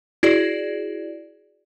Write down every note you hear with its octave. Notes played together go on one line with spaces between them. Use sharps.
E4 F#4 G#4 D5